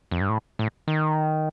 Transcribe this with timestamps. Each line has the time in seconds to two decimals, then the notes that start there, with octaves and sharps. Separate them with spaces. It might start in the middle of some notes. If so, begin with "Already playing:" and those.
0.11 F2
0.21 G2
0.29 A2
0.59 A2
0.88 D#3